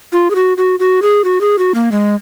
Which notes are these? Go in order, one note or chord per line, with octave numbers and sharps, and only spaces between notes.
F4
G#4
F#4
F#4
F#4
G#4
F#4
G#4
F#4
A#3
G#3